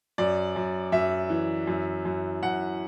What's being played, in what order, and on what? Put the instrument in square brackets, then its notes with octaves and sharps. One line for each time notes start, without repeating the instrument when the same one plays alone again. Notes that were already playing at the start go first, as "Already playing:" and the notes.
[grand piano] F#2 D5
F#2
F#2 E5
E3
F#2
F#2
F#2 F#5